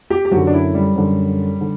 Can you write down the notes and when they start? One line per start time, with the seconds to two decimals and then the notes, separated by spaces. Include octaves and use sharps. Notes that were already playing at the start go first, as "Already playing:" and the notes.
0.10 G4
0.25 G4
0.31 F#2 D3 F#4
0.47 D4
0.54 E4
0.74 G3
0.95 F#2 D3
1.61 D3